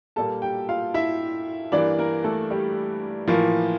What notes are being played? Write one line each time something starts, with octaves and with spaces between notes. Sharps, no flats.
A#2 G3 A#3 A4 A5
G4 G5
F4 F5
E4 E5
G2 E3 A#3 D4 D5
A#3 A#4
A3 A4
G3 G4
A2 E3 F3 A#3 F4